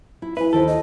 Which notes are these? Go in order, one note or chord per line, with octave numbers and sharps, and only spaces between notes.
E4
E4 B4 E5 G#5
D#2 D#3 A4 C5
D#5